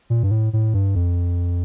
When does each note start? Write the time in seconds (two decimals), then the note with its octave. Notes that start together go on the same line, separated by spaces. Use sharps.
0.10 A#2
0.23 G2
0.31 A2
0.53 A2
0.74 G2
0.95 F2